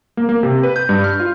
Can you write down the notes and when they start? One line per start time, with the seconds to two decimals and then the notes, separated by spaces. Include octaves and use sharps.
0.17 A#3
0.29 A#3
0.43 C3
0.63 B4
0.76 G6
0.89 G2
1.04 F6
1.20 F4